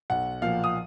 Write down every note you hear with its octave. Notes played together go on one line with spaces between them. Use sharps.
B1 F#5
A#2 F3 A#3 F5
D#6